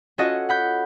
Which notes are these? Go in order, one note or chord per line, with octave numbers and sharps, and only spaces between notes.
C#4 F4 F#4 A4 D#5
F#5 B5 G6